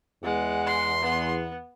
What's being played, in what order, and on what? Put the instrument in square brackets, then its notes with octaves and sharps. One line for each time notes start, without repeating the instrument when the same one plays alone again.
[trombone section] E2 [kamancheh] G#3 F#5
[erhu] C6
[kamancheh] B3